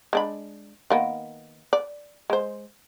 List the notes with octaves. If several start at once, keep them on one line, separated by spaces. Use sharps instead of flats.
G#3 D4 B5
D#3 A#3 B3
D5
G#3 C5